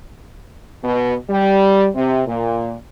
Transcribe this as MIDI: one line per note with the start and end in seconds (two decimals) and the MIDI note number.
0.84 1.15 47
1.30 1.89 55
1.95 2.22 48
2.28 2.75 46